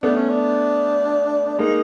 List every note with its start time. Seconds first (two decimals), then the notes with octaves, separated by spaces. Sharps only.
0.03 A3 B3 D4
0.16 C#4
0.29 D4
1.59 G#3 A#3 D#4